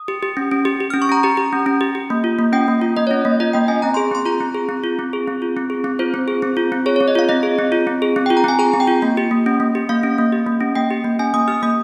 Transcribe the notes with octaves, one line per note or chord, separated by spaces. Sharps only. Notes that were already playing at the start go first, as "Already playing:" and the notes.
Already playing: D#6
G4
G4
C#4
C#4
G4
G4
C#4 F6
C#6
C#4 A#5
G4 A#5
G4
C#4
C#4
G4
G4
A#3
F4
A#3
C#4 G5
A#3
F4
A#3 D#5
C#4 C#5
A#3
F4 D#5
A#3 G5
C#4 G#5
C4 A#5
G#4 C6
C4 C6
F4 A#5
C4
G#4
C4
F4
C4
G#4
C4
F4
C4
G#4
C4
F4 C5
C4
G#4
C4
F4
C4
G#4 C#5
C4 C#5
D#5
F4 F5
C4 D#5
G#4
C4
F4
C4
G#4
C4
F4 G5
A#5
C4 G#5
G#4 A#5
C4
G5
F4
A#3
G4
A#3
C#4
A#3
G4
A#3 F5
C#4
A#3
G4
A#3
C#4
A#3 G5
G4
A#3
C#4 G#5
A#3 D#6
G4 F6
A#3 D#6